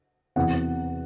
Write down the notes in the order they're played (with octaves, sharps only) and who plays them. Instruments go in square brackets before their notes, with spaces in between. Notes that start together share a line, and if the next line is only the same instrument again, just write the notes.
[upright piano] E2 C3 E3 F#5